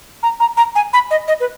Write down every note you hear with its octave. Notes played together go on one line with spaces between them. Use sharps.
A#5
A#5
A#5
G#5
B5
D#5
D#5
B4